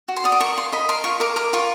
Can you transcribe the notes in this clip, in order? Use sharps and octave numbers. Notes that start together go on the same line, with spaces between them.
F#4
C6
D5 D#6
D6
A#4 C#6
F4 C6
D#5 B5
A#4 C6
F4 C#6
A#4 D6
A#4 D6
F4 C#6